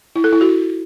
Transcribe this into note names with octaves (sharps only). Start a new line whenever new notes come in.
E4
A4
E4
F#4